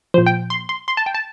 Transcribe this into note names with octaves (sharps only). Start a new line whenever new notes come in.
A#2 F3 C5
G5
C6
C6
C6
A5
G5
A5